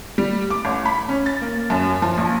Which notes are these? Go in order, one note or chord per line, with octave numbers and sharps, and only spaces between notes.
G3
D6
A1
B5
C#4
A6
A#3
F#2
F3
A#1